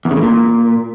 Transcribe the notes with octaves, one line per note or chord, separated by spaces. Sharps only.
E2
C#3
A2
A#2